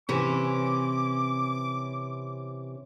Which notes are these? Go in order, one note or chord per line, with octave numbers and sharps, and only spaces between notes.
C3 E3 C#4 D6